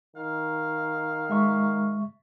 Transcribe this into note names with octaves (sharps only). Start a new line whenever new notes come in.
D#3 F5
G#3 E5 C#6